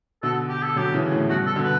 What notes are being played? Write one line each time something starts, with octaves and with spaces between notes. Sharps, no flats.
B2 D3 A4
G4
A4
D3 F#3 G4
C#3 E3
A2 C#3
G2 B2 F#4
A4
B2 D3
B4